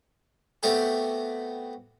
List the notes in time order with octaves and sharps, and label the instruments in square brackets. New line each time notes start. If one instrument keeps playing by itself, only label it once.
[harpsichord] A3 B3 C4 F#4 G4 A4